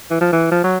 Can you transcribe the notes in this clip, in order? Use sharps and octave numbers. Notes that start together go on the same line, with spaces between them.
E3
F3
E3
F3
F#3